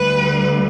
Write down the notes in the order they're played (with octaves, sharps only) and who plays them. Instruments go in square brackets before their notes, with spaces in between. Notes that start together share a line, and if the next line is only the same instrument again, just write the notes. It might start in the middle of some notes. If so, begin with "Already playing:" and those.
Already playing: [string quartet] D2 D3 G3 B4